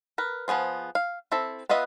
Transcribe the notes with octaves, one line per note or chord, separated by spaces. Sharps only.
A#4 B4
F3 B3 G#4 C5
F5
C4 E4 A4 E5
B3 F4 B4 D#5 E5